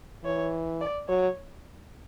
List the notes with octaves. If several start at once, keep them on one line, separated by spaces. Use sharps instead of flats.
E3 C#5
D5
F#3 C#5